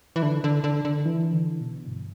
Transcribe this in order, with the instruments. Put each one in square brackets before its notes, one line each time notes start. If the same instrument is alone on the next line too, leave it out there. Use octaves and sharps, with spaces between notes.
[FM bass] E3
D3
D3
D3
D3
E3
D3
B2
G2